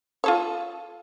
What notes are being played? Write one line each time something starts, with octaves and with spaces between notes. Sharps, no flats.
F4 A4 C#5